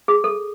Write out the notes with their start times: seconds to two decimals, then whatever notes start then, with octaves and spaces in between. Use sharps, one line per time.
0.08 G#4
0.24 A4